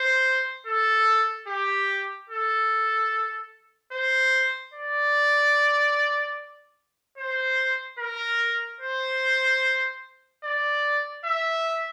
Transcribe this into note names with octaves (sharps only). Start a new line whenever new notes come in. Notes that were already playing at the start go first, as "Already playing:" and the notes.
Already playing: C5
A4
G4
A4
C5
D5
C5
A#4
C5
D5
E5